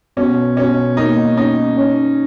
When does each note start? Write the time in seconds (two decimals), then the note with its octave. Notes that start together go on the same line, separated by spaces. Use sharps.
0.17 B2 C#4
0.57 B2 C#4
0.97 A#3 D#4
1.37 C#4 D#4
1.77 C#4